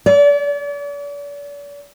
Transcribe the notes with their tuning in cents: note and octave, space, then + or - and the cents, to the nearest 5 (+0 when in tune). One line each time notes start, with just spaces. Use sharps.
D5 -40